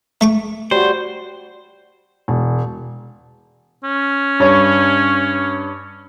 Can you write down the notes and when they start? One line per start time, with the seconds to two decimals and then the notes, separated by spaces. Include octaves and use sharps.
0.21 A3 C#6 D6
0.71 G3 F#4 C5
2.28 E1
3.84 C#4
4.40 G2 C#5